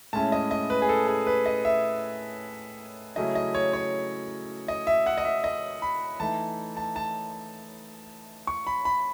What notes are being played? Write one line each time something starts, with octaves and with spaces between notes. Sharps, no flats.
A2 G#3 C#4 E4 A5
D#5
D#5
B4
G#4
A4
G#4
B4
D#5
E5
C#3 F#3 A3 C#4 E4 D#5
D#5
C#5
C#5
D#5
E5
F#5
D#5
E5
D#5
B5
E3 A3 D#4 A5
A5
A5
C#6
B5
B5